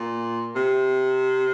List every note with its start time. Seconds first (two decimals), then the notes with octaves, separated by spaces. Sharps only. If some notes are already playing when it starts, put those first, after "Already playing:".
Already playing: A#2
0.55 C3